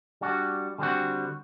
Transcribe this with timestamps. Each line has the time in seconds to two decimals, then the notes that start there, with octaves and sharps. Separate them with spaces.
0.21 G3 D4 F#4
0.78 D3 G3 C4 F#4